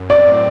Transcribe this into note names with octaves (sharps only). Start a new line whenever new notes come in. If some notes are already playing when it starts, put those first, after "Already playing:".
Already playing: F#2
C4 D5
A2